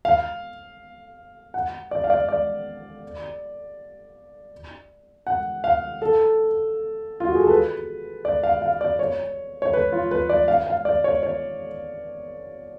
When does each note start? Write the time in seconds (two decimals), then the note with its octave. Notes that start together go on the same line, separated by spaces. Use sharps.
0.05 F5
1.54 F#5
1.91 D5
2.04 F5
2.10 D5
2.29 D5
5.27 F#5
5.64 F5
6.02 A4
7.20 F4
7.28 F#4
7.35 G#4
7.43 A4
7.50 B4
8.25 D5
8.43 F5
8.62 F5
8.81 D5
8.99 C#5
9.62 C#5
9.73 B4
9.92 F4
10.11 B4
10.30 D5
10.48 F5
10.67 F5
10.85 D5
11.04 C#5
11.23 C#5